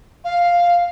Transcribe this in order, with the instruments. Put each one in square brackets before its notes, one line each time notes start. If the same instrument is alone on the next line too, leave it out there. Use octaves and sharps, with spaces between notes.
[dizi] F5